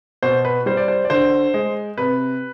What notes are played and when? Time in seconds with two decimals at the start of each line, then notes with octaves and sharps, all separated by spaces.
0.23 B2 C5
0.45 B4
0.66 G3 C5
0.77 D5
0.88 C5
1.05 D5
1.10 D3 C5
1.54 G#3
1.98 C3 B4